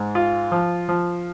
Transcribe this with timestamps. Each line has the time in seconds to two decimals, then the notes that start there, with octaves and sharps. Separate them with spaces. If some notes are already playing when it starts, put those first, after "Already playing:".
Already playing: G#2
0.15 F4
0.52 F3
0.89 F3